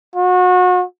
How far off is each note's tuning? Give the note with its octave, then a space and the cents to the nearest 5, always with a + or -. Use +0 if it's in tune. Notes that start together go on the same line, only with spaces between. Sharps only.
F#4 -30